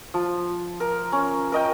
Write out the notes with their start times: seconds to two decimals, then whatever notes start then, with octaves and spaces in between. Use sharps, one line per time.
0.14 F3
0.80 A#4
1.12 C#4
1.52 A#4 D#5 G5